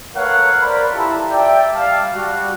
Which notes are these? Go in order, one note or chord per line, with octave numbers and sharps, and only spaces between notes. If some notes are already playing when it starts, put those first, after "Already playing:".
A3 A#4 B4 C#5 F5 F#5
A#4 C5 D5 B5
E4 F4 G4 A4 A5 A#5
D5 E5 G5
G3 F5 A5
G3 F#4